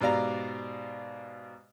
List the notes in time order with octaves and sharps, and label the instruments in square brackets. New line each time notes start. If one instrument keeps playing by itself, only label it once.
[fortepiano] G#2 B2 G4 D5 F5 A#5